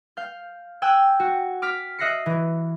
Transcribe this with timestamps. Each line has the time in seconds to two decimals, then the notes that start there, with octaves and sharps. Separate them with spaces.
0.17 F5 G6
0.82 G5 G#5 E6 F#6 G6
1.20 F#4
1.62 D6 F6 B6
1.99 D#5 E5 F#6 A#6 C7 C#7
2.26 E3